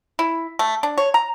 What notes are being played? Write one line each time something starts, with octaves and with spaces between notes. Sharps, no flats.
E4
A3
D4
C#5
A#5